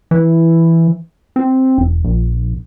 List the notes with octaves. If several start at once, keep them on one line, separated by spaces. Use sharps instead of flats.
E3
C4
E1
A#1